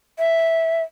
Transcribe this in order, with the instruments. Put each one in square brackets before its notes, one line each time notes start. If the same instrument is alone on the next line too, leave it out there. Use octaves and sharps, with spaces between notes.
[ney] E5